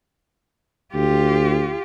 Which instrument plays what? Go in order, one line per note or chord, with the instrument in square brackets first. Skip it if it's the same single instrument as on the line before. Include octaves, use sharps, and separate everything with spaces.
[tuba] D2 [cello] F4 G4